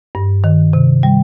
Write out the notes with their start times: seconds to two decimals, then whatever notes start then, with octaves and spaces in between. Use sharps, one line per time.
0.15 G2
0.44 D#3
0.73 C3
1.03 G3